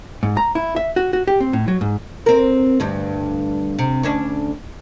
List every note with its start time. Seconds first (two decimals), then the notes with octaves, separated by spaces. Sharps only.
0.23 G#2
0.37 A#5
0.55 E4
0.76 E5
0.96 F#4
1.13 F#4
1.27 G4
1.40 C4
1.53 A2
1.68 F#3
1.81 G#2
2.26 C4 A#4
2.80 D2 G2
3.79 C3
4.03 D2 C#4 D4